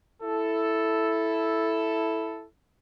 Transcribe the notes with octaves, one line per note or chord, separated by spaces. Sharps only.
E4 A4